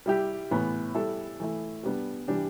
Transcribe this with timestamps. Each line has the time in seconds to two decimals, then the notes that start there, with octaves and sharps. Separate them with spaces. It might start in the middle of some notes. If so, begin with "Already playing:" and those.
0.06 G3 E4 G4
0.51 A2 E3 B3
0.95 G3 E4 A4
1.40 E3 A3 E4
1.83 G3 B3 D4
2.28 E3 G3 D4 G4